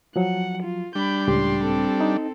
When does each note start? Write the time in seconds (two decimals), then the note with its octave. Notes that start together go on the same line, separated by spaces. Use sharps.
0.16 F3 F#3 F#5
0.63 F4
0.95 G3 D4 B5 G6
1.28 C#2 A2 G4 C6
1.61 C4 A4
2.01 D#4